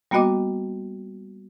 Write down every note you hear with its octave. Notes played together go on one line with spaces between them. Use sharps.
G3 A#3 B3 F#4 D#5 D6